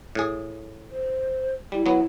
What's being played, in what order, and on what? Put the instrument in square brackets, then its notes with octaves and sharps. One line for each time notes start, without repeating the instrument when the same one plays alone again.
[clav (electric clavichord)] A2 G#4
[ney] C5
[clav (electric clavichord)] G3 [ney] E4
[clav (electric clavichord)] F#3 B3